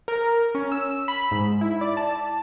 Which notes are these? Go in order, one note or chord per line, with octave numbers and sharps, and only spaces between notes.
A#4
C#4
E6
B5
G#2
E4
D5
A5